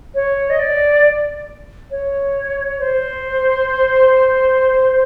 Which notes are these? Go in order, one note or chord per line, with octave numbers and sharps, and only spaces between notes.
C#5
D#5
D5
C#5
C5